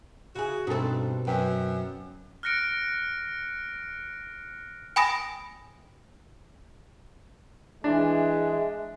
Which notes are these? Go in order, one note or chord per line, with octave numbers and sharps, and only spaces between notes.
C#3 F#4 G#4
G2 B2 C4 D#4 A4
F#2 B4 G5
F6 F#6 A#6 C#7 D7
G5 G#5 B5 D#6 A#6
E3 G#3 D4 E5